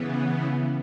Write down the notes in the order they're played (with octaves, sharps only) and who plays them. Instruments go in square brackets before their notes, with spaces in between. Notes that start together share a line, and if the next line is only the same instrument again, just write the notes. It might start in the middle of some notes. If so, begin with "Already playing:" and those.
Already playing: [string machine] C#3 E3 B3